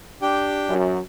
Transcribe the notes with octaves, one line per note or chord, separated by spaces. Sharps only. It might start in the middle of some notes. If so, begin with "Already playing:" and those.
D4 G4 G5
F#2